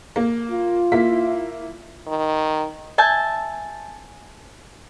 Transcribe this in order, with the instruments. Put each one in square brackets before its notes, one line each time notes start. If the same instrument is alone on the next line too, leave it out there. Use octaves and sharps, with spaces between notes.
[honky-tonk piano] A#3
[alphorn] F4
[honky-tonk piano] A#3 E4 B6
[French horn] D#3
[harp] E5 G#5 A5 G6